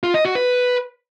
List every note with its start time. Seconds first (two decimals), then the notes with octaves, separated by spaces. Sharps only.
0.03 F4
0.14 D#5
0.25 F#4
0.35 B4